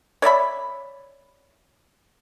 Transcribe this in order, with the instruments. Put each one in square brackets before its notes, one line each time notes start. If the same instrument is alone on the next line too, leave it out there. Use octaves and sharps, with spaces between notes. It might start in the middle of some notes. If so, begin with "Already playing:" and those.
[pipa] C#5 D5 E5 B5